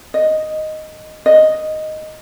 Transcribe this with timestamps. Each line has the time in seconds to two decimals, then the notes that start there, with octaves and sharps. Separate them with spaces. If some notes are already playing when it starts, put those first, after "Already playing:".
0.14 D#5
1.26 D#5